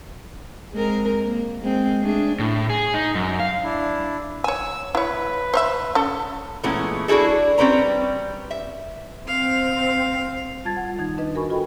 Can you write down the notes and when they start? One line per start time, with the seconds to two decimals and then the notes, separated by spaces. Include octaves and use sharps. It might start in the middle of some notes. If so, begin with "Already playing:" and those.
0.73 G#3 C4 A#4
1.24 A#3
1.62 G#3 C4
2.02 A3 D4 G#4
2.39 A2
2.70 G#4
2.94 D#4
3.15 F#2
3.40 F5
3.64 D4 E4
4.44 C#5 G#5 E6
4.95 E4 B4 C#5
5.54 C5 C#5 E5
5.95 C#4 A4
6.63 A#2 E3 G#3 A3 B3 C#4
7.08 D4 E4 F#4 G#4 A4
7.58 G3 C4 C#4 B4 A#5
8.51 E5
9.27 C4 F5
10.65 G3 F4 A5 G#6 A6
10.77 F#5
10.98 D#3 D#4 G#6
11.18 D4 D#4 B4 D#5
11.35 F#4 A#4 G#5 B5 C#6
11.50 F4 F#4 A4 D#5 G5 B5